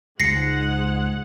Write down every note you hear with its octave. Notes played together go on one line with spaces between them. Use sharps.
C#2 G#2 G#3 F#5 A#6 C7 C#7